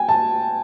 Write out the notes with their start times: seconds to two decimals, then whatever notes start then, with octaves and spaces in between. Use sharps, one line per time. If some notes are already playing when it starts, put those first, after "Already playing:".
Already playing: G5 G#5
0.09 A5